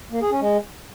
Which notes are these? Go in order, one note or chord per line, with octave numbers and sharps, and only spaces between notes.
A#3
G#4
C#4
G#3